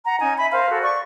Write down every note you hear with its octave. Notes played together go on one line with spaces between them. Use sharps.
F#5 A#5
C#4 D#4 G#5
E5 B5
A#4 C5 F5
F#4 A4
D5 C#6